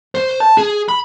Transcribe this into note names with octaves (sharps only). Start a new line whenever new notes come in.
C5
A5
G#4
B5